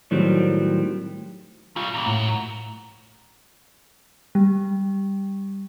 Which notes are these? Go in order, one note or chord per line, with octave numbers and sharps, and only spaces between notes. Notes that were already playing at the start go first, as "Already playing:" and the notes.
A2 D#3 F#3 G3 C4
C#3 G3 F4
A#2 E3
A2 F#4 A#4
G3